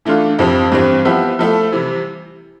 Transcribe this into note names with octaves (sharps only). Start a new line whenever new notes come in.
E3 A3 D4 F4
F2 E3 G3 C4
G2 E3 G3 C4
F3 B3 E4 G4
F3 A3 E4 A4
C3 E3 G3